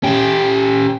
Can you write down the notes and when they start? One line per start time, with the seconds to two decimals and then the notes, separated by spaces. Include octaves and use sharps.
0.03 C#4 G4